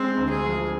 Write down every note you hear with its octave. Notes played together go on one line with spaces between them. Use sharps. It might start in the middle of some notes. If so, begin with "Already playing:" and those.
Already playing: G#3 C4
D2
G#4
F3